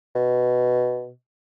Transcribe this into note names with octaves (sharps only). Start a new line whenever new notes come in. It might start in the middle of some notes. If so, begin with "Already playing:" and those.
B2